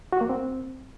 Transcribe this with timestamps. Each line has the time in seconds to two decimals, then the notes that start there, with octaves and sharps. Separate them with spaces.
0.13 F#4
0.21 A#3
0.29 C4